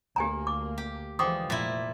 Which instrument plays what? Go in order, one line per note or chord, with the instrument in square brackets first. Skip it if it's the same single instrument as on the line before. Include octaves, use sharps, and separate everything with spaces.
[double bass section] D2 A#3 [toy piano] G4 G#5 A#5
[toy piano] D6
[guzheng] G4
[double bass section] D3 E3 G#3 [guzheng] F3 [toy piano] G5 D6 D#6
[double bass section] F1 [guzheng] A#2 E4